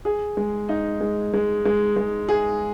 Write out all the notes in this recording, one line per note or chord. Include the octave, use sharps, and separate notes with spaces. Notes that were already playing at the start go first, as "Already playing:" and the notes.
G#4
G#3
D#4
G#3
G#3
G#3
G#3
G#4